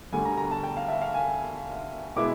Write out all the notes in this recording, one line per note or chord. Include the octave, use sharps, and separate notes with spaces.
D2 D3 G3 G#5
A#5
A#5
A5
G5
F5
E5
F5
G#5
B2 G#3 B3 E4 D6